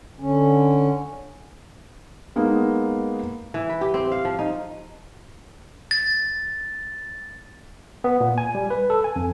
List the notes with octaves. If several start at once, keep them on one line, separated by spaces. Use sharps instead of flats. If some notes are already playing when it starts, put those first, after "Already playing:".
D3 C#4
G#3 A#3 B3 D#4
E3
B4
G4
C4
F5
F3
D#4
A6
B3
A#2
G#5
G3
B4
A4
G#5
F2